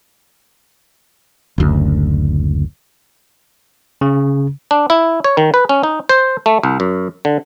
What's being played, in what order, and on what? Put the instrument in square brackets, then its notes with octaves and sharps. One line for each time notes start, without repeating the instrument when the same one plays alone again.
[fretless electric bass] F#1 D2
[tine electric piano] C#3
[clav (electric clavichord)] D4
E4
C#5
D#3
B4
C#4
D#4
C5
A3
C2
F#2
D3